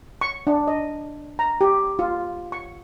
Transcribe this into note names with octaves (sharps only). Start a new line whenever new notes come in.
C#6
D4
D#5
A#5
G4
F4
C#6